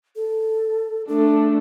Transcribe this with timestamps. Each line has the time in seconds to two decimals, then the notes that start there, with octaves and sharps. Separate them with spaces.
0.16 A4
1.08 A3 D4 A4